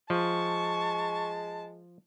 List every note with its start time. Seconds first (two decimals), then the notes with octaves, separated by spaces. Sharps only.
0.10 F3 G#3 A5 C#6